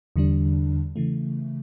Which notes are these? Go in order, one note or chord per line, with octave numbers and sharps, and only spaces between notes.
E2 D3 G3 D4
C#3 E3 A3